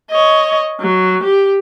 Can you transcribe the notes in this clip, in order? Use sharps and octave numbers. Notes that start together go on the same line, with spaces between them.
C#5 D#5
F#3
G4